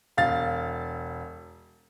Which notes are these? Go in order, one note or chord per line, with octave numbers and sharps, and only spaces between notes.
E1 F5 A6